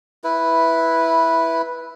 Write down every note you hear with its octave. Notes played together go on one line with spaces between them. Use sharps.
E4 B4